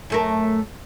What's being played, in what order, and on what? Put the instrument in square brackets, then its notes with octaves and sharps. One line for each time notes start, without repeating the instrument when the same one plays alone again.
[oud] F#2 A3 A#4